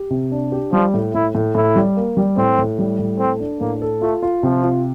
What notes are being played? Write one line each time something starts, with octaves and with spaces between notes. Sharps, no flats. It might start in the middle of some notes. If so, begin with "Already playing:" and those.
Already playing: G4
C3
D4
G4
F3 G3
A2
A2 E4
A2
A2 E4
G3
A#3
G3
A2 C4
A2
G3
A2
C4 A4
D4
A2 A#3
A4
A3 F4
F4
C3 F3
F4